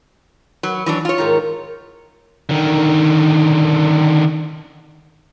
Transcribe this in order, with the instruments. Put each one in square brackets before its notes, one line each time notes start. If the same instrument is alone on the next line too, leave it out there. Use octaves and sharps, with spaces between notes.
[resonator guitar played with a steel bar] F#3 [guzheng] B4 B5
[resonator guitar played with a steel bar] E3 F#3 D4
F4 C#5
[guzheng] G#2 D#3 A#5
[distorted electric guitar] D3 D#3